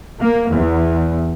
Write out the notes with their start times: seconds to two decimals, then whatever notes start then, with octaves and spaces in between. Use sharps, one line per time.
0.20 A#3
0.52 E2